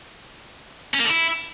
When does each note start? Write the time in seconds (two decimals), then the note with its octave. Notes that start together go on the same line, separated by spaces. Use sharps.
0.94 C#4
0.99 A#3
1.05 D3
1.10 E4